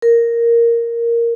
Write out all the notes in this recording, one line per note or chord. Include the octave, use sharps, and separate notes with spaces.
A#4